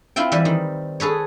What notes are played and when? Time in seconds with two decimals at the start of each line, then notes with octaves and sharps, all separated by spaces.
0.16 C4 E4 F4 E5 G5
0.32 E3 G3
0.45 D#3
1.00 G#4 A4 B4 C#5